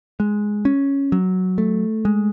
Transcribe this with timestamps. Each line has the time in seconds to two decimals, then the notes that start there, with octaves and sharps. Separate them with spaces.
0.20 G#3
0.65 C#4
1.12 F#3
1.58 A3
2.05 G#3